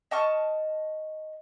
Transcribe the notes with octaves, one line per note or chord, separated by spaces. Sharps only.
D#5 A5 C#6 F6